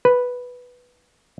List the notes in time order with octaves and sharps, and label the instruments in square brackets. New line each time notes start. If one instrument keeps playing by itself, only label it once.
[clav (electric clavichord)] B4